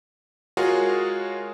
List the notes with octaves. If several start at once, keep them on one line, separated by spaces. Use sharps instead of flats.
G#3 F4 F#4 G#4 A#4 C#5